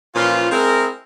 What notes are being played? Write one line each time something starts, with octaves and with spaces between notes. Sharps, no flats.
A#2 E3 F3 C#4 F4
G#3 C4 E4 G#4 A#4